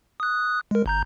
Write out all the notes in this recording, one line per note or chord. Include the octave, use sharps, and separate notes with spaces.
D#6 F#6
G#3 A#4
G1 A#5 G6